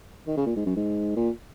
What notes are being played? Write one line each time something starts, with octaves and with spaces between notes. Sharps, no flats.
D#3
C#3
A#2
G#2
F#2
G#2
A#2